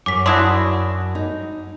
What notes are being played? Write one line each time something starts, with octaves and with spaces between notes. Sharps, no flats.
F#2 D6 B6
D4 E4 F#4 C6 D6 D#6
D#4